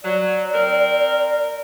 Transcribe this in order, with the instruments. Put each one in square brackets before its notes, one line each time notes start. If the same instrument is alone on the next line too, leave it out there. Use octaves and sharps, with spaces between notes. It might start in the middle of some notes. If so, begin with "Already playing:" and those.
[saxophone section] F#3 [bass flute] D5
[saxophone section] C4 A#4